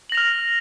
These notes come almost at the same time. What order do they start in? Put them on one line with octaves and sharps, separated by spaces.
F#7 A#6 F7 F6